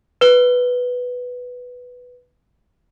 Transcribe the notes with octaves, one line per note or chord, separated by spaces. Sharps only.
B4 G7